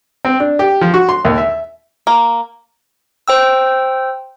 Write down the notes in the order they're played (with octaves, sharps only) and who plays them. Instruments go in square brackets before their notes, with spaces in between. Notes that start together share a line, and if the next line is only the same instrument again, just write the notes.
[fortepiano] C4
D4
G4
F3
F#4
C6
D#2
E5
[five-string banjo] A#3
[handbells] C5 G5 E6